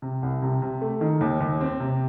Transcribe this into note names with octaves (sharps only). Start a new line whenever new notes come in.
C3
C2
C3
C3
A3
D#3
D#2
D#2
C4
C3